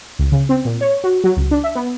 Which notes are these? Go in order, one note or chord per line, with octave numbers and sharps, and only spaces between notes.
C#2
C#3
C4
A#2
C#5
F#4
F#3
C#2
D4
E5
B3